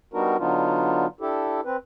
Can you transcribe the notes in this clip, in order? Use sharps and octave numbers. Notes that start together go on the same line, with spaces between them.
G3 B3 D4 D#4 F#4 A#4
D3 F#3 B3 D4 D#4 F4
D4 E4 G4 A4
C4 B4